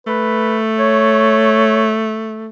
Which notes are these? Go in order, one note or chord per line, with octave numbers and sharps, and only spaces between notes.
A3 B4
C#5